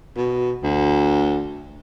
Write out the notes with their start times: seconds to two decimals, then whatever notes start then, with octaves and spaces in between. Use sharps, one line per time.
0.16 B2
0.63 D2